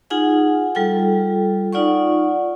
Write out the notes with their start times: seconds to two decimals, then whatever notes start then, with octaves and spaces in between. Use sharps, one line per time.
0.10 D#4 F4 G#4 F#5 G#5
0.75 G3 F4 A4 G5
1.73 D#4 F4 D5 F#5 C#6